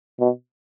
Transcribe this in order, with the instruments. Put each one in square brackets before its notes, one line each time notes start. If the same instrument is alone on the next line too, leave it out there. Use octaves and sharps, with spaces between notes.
[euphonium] B2